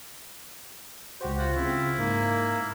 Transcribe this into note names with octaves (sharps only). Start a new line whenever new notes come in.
C#2 F#4 G4 C5
F4 F#4
C#3 C4 E4
G#2 A#3